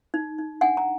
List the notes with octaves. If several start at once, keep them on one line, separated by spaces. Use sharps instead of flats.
D#4
D#4
D4 F#5 G#5
A#5